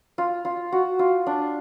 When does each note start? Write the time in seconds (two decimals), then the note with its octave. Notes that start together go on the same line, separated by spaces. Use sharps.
0.18 F4
0.45 F4
0.72 F#4
0.99 F4
1.27 D4